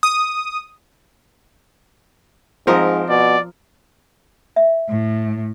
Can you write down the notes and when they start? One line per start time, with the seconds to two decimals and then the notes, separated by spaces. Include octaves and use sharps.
0.03 D#6
2.67 G#2 F3 C4 A#4 D#5
3.10 B2 D5
4.56 E5
4.88 A2